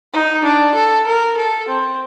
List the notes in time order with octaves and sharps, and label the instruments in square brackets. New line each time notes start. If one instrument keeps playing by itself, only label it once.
[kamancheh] D#4
D4
A4
A#4
A4
C4